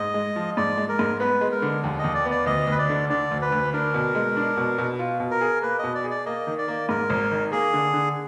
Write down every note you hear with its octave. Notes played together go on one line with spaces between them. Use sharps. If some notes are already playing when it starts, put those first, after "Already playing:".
Already playing: G#2 D#5
G#3
F3
G#2 D5
G#3
A#4
G#2
B3 B4
G#3
A#4
D3
D#2
D#5
D#2
D5
B3
D5
D2 D#5
D2 B4
D5
D3
D3 D5
D2
B4
D2
D4 A#4
B2
G#3
D4
B2
B2
F4
B2
A#4
G#4
A#3 B4
B2 D#5
D5
G#4
D5
A#3 D#5
D#3
D5
A#3
G#2 A#4
G#1
D#3
A#3 G#4
D3
D3